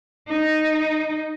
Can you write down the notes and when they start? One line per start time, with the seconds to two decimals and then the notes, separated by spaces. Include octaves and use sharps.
0.29 D#4